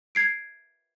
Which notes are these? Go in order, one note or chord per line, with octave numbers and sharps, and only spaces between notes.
G#6 C7 D7